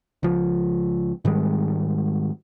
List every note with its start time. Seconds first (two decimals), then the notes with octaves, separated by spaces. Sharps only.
0.23 C#2 F3
1.25 G#2 D#3 G3 G#3